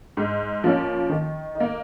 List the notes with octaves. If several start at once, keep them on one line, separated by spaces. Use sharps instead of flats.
G#2
F3 A#3 C#4
D#3
D#4
A#3